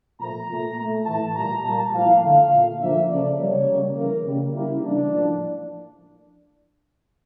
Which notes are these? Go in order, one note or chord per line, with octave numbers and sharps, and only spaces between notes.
A#2 F3 A3 A#5
A#2 A3
A#2 A3
A2 E3 A3 A5
A#2 G3 A#3 A#5
A#2 G3 A#3 A5
A2 F3 A#3 F5
D3 A3 F5
A#2 A3
D3 F3 A#3 E5
C#3 F3 A3 D5
C#3 G3 A#3 C#5
C#3 G3 A#3
C#3 E3 A#3 A#4
C#3 G3 A#3
C#3 G3 A#3 E4
C#3 E3 G3 A#3 D4
A2 F3 A#3